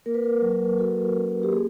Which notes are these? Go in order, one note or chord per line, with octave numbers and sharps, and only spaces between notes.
A#3 A#4
B4
A#4
F#3
F#4 A4
C#4
G4
A#3 G#4